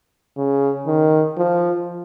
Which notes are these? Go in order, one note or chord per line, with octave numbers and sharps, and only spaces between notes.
C#3
D#3
F3